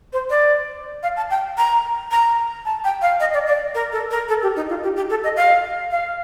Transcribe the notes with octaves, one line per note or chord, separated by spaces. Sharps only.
C5
D5
F5
A5
G5
A#5
A#5
A5
G5
F5
D#5
D5
D5
A#4
A4
A#4
A4
G4
D#4
F4
G4
G4
A4
D#5
F5
F5